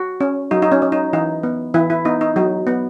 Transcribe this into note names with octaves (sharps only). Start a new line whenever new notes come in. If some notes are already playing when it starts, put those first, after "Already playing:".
Already playing: F#4
C#4
F#3 D#4
D#4
C#4
C#4
D#4
E3 D#4
B3
E3 E4
E4
B3 D#4
D#4
F#3 D#4
B3